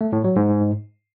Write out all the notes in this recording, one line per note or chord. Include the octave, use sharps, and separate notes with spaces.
A3
A2
F#3
G#2